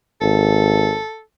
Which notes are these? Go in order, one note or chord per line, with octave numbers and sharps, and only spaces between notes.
G#1 A4